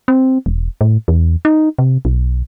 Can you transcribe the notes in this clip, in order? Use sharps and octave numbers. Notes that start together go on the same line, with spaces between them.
C4
E1
A2
E2
D#4
C3
B1